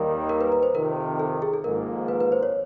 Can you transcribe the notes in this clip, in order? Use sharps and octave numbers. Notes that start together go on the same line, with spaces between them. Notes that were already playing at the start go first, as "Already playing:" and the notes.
Already playing: D#2 D#3 G3 A#3 A#4
A#4
B4
B4
C5
F2 C3 D#3 A#4
A4
G#4
A4
G#1 G#2 F3 A#3 A#4
B4
B4
C5
C#5